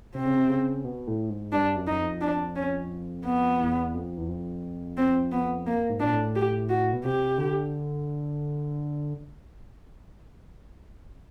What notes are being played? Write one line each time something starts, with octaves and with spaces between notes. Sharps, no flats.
C3 C4
C#3
C3
C#3
B2
A2
G#2
G2 D4
F#2
F#2 D#4
F2
D4
C#4
B3
E2
F2
E2
F2
C4
B3
A#3
G#2
A#2 D4
A2
G4
F#4
B2
C3 G4
D3